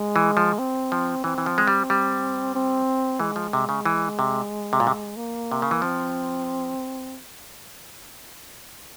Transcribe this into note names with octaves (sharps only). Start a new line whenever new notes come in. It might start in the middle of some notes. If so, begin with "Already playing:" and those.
Already playing: G#3
E3
F3
C4
F3
E3 C4
E3
F3
G#3
G3
G3
C4
E3 G#3
F3
C3
C#3
E3
C3
C3
A#2
C3
A#3
C3
C#3
E3
F3 C4